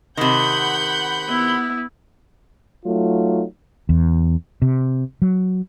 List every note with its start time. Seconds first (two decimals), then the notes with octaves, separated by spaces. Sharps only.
0.17 C3 D#3 F#5 B5 G6
1.29 B3 E4
2.85 F#3 A3 D#4 F4
3.89 E2
4.62 C3
5.22 F#3